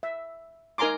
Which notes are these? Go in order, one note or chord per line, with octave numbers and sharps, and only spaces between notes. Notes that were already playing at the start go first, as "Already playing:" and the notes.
E5
D#4 A#4 G#5 A#5 C6 D6